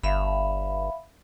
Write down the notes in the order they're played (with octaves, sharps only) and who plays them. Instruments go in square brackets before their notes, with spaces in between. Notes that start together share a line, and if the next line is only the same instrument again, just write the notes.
[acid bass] G1 [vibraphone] E5 F5 B5